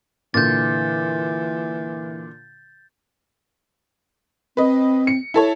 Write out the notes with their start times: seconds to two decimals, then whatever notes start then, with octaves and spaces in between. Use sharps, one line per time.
0.34 A#2 D3 E3 G6 A6
4.57 C4 B4 D#5
5.07 C#7
5.34 E4 A4 C#5